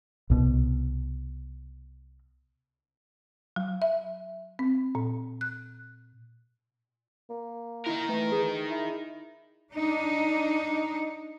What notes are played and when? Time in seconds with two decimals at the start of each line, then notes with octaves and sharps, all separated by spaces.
0.30 C2 B2
3.56 F#3
3.82 E5
4.59 C4
4.95 A#2
5.41 F#6
7.30 A#3
7.86 D#4 E4 A#4
8.09 E3 A3
8.32 G#4
8.70 E4
9.72 D4 D#4